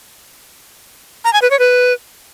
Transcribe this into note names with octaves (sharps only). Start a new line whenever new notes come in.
A#5
G#5
B4
C#5
B4